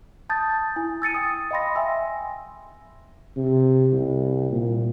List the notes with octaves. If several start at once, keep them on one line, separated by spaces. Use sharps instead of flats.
A5 D#6 G6 A6
E4 G#5
E6 A6 C#7 D#7
G5 D#6
D#5 F5 G5 B5 C6 A#6
E5 G5 G#5 C6 E6
C3
C2
A#2